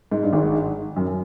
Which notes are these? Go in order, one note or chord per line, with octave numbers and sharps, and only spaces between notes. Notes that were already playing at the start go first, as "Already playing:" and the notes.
G#2
G2
G#1 G#2
F#2